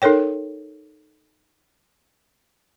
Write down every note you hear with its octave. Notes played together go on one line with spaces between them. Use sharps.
D#4 A4 A#4 C#5 G5